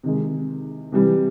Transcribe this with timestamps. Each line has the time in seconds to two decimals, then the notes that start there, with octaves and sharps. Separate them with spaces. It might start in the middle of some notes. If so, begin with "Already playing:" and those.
0.03 C3 D#3 G#3
0.92 C3 E3 G3